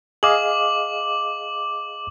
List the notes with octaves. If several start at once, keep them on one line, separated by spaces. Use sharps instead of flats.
G#4 D#5 F5 D6 F#7